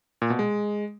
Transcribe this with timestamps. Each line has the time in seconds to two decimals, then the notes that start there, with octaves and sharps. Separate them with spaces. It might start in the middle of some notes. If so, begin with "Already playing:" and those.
0.22 A#2
0.30 B2
0.39 G#3